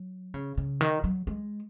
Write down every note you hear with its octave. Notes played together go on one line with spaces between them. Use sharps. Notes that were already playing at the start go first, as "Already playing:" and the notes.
Already playing: F#3
C#3
C#3
D#3
F#3
G#3